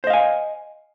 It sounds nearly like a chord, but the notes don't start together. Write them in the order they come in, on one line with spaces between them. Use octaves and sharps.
C5 D#5 F5 G#5